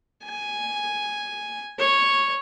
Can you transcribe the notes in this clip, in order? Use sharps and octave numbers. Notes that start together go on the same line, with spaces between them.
G#5
C#5